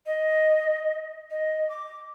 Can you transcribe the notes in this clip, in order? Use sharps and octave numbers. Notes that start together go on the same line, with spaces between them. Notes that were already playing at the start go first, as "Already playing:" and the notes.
D#5
D#5
D6